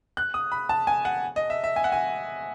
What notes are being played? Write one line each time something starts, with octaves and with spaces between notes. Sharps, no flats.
F#6
D#6
B5
A5
G#5
F#5
D#5
E5
E5
G#5
F#5
G#5